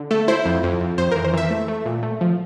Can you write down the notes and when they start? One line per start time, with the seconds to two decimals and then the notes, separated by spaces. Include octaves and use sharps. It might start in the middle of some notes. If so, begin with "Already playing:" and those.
Already playing: D3
0.11 A3 A4
0.28 E4 C5
0.45 F2
0.63 F2
0.81 F2
0.98 F2 C5
1.11 A#4
1.16 E3
1.24 C5
1.33 E3 E5
1.50 A3
1.68 A3
1.86 A#2
2.03 A3
2.21 F3